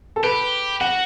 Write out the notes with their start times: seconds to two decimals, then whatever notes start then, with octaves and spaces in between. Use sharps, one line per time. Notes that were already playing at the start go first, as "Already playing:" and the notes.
0.16 A4
0.23 G4 B4
0.81 F#4 F#5